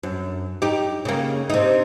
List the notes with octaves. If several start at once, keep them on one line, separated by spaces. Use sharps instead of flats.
F#2
D#4 G4
C#3 A#3
C3 D#4